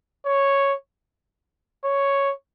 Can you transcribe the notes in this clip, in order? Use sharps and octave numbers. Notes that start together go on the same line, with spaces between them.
C#5
C#5